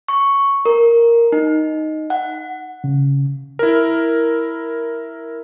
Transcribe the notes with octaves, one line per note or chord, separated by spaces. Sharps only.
C#6
A#4
D#4
F#5
C#3
E4 A#4